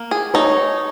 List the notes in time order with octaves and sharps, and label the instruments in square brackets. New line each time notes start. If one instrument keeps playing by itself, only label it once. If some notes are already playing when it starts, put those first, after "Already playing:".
Already playing: [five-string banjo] A#3
G#4
[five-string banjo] D#4 [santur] C#5